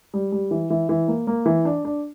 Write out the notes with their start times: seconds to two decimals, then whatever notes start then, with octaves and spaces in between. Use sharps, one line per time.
0.14 G3
0.32 G3
0.51 E3
0.70 E3
0.89 E3
1.08 A#3
1.27 A#3
1.46 E3
1.65 D4
1.85 D4